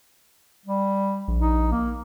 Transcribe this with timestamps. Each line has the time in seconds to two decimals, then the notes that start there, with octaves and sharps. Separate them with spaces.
0.66 G3
1.28 A#1
1.41 D#4
1.72 A#3